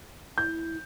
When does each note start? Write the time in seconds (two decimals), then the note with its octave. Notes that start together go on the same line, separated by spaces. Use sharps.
0.38 E4 G6